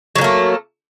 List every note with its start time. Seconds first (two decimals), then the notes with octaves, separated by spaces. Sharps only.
0.15 F#3
0.18 D3
0.21 A#3
0.24 A3